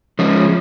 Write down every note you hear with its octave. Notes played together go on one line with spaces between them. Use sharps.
F3 G#3 C#4